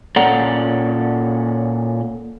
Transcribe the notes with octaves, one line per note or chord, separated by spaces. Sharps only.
A#2 C#4 A4 D5 F#5 A#5